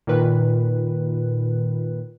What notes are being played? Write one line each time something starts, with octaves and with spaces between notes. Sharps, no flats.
A#2 D#3 B4